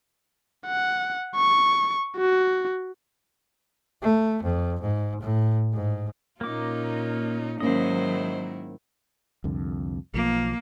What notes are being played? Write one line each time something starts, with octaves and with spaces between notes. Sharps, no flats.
F#5
C#6
F#4
A3
F2
G#2
A2
G#2
A#2 A#3 C#4 D#4 F4 D6
G#2 D#3 F#3 A#3 C#4 E4 C5 D#5
C2 F2 D3
B1 F3 A#3